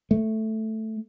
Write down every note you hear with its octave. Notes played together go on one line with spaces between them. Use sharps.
A3